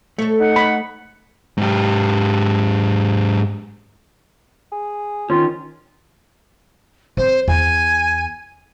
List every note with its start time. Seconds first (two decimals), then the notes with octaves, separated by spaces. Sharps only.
0.18 A3 A4 C#5
0.40 D#4 F#5
0.56 C#5 B5
1.57 G#2 G4
4.72 G#4
5.30 D#3 C#4 F4
7.17 C4 C5
7.48 E2 G#5